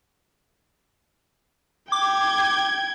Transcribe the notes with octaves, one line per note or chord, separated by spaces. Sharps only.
G5 D6 G#6